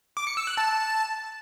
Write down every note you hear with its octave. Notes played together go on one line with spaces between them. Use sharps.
D6
C#7
E6
F#6
A5